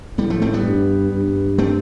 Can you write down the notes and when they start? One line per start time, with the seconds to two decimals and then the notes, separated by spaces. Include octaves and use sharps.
0.18 A2 G3 B3
0.30 F3 A3
0.42 A3 C4
0.53 G3 B3
0.65 G2
1.12 G2
1.58 A3 C4